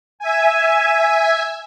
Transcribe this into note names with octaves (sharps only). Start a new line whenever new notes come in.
E5 G#5